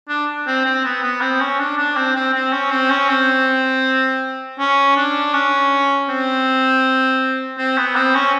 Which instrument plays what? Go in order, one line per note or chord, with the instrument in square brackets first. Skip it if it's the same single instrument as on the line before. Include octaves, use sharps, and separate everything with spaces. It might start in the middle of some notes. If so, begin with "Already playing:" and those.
[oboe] D4
C4
C4
B3
B3
C4
C#4
D4
D4
C4
C4
C4
C#4
C4
C#4
C4
C#4
D4
C#4
C4
C4
B3
C4
C#4